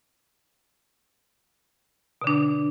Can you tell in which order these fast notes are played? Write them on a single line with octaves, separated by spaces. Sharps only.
B2 D3 D4